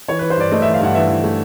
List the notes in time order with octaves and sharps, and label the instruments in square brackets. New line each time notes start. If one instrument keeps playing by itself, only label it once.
[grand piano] E3 C#5
B4
E3
C5
G2 D5
A3 D#5
E5
E3
F5
G2 F#5
E3 E5
E3
A3